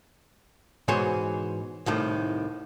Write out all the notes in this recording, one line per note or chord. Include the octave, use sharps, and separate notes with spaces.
G#2 B2 E3 G#4 C5 C#5
C2 A2 D#3